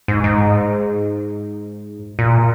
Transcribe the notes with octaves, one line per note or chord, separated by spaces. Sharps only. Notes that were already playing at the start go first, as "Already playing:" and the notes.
G#2
G#2
A#2